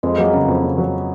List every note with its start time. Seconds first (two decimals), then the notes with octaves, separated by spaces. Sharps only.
0.03 F2 G#3
0.18 F#3 A#3
0.33 C#3 B3
0.48 F2 C#4
0.63 C#3
0.78 F#3